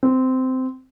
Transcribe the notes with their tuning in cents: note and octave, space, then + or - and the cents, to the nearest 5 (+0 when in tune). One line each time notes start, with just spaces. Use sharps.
C4 -15